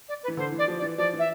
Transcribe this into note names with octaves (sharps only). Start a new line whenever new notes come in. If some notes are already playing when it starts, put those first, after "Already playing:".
D5
B4
E3
D3 C5
E3
D5
F3
D5
E3
F3 D5
E3
E5